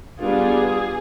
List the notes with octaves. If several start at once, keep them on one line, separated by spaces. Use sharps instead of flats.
G3 B3 D4 F4 G#4